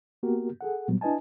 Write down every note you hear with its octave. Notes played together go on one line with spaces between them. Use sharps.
A#3 B3 F#4 G4 A#4
G#4 A4 F#5
A#2 F#3 G3 B3
D4 E4 B4 D#5 G#5 A5